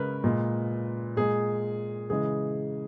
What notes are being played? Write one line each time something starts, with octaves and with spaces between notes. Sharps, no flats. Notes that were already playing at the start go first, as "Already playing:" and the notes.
Already playing: C#3 G#3 A#4 B4
A#2 G#3
A#2 G#3 G#4
C#3 E3 G#3 G#4